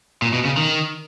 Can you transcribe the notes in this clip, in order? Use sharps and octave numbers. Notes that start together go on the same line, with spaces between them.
A#2
B2
C#3
D#3